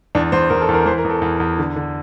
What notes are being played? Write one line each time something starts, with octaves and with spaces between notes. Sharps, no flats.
E2 D4
E2 C5
E2 A#4
A4
E2
A#4
E3 C5
A#4
E2
A4
E2
E2
D3
D3